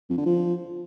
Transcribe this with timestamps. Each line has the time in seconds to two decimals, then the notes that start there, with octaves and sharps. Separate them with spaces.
0.10 F2
0.18 D3
0.26 F3